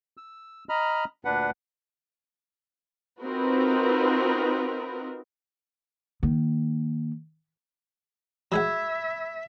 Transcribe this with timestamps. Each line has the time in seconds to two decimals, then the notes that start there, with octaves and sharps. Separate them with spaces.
0.17 E6
0.69 D#5 A#5 B5 F6
1.25 D2 A#2 D4 B4 F#5
3.22 C4 D#4 F4 F#4 A#4 B4
6.23 D#3 A#3
8.52 F#3 G#3 E5 F#5 B5 E6 G#6